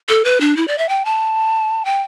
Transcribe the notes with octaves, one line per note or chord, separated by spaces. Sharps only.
A4
B4
D4
E4
D5
E5
G5
A5
G5